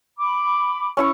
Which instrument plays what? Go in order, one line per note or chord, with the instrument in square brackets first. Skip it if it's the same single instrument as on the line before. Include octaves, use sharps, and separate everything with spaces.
[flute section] B5 D6
[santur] C#4 E4 C#6